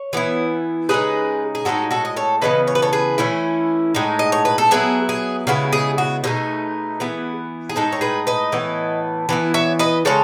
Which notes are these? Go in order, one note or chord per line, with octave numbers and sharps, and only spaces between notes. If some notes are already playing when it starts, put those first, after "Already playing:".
Already playing: C#5
E3 B3 E4
C#3 G#3 D#4 G#4 B4
G#4
A2 G#3 D#4 F#4 A4
F#4 A4
D#5
A4 C#5
C#3 E3 B3 B4 D#5
C#5
B4
A4 C#5
G#4 B4
E3 A3 C#4 E4
A2 G#3 D#4
D#5
C#5
B4
A4
F#3 B3 E4 G#4
G#4
C#3 G#3 B3 E4 F#4
G#4
F#4
B2 A3 D#4 G#4
E3 B3 E4
G#4
A2 G#3 D#4 A4
C#5
G#4 B4
B4 D#5
A2 E3 B3
E3 B3 E4
C#5 E5
B4 D#5
C#3 G#3 A4 C#5